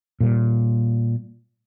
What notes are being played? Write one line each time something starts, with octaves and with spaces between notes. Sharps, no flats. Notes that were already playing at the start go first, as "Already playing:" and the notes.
A#2 G3